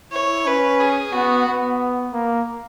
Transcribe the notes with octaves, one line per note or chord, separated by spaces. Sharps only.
E4 C#5
C#4 B4
G#4
B3 F#4
B3
A#3